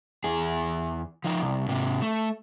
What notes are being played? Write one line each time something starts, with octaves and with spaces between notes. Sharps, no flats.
E2 G#4
F3 D#4
C2
G#2 C3
A3